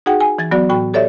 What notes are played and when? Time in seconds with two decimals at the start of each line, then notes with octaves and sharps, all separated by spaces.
0.06 D#4 F#4 G#4 F#5 G5
0.20 G#5
0.38 E3 G#6 A6
0.51 F#3 B3 F#4 D5
0.69 A2 F#4 G5 B5
0.94 G4 A4 C#5 D5 E5